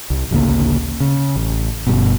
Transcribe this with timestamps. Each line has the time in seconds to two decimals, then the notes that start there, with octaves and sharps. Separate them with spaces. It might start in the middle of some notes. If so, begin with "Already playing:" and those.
0.10 C2
0.31 A1 D2 C#3 A#3
1.00 C#3
1.36 A1
1.87 G1 G2 B2